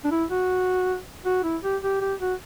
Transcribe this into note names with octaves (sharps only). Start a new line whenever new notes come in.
D4
E4
F#4
F#4
E4
G4
G4
G4
F#4